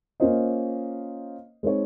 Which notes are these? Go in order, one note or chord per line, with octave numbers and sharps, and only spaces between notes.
A#3 C#4 F4 C5 D#5
G#3 C4 D#4 G#4 C#5